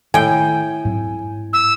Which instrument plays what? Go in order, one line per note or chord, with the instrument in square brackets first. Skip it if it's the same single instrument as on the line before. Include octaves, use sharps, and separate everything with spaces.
[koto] A2 G5 [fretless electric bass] D#3 A3 [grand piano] G#5
[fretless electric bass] G#2 F#3 C4
[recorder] E6